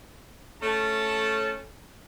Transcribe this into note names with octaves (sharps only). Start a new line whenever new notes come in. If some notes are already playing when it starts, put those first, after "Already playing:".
A3 C#4 A5